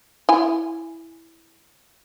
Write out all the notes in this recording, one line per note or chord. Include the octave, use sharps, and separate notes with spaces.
E4 G#5